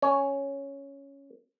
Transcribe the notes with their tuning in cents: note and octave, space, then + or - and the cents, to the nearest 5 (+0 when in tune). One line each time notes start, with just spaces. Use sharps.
C#4 +0 C#5 +0